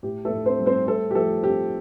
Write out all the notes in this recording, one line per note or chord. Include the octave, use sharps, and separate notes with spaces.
A2 G4
A3 A4
A2
C4 C5
G3
C4 C5
A3 C4 A4
G4
F3 A3 A4
C4 G4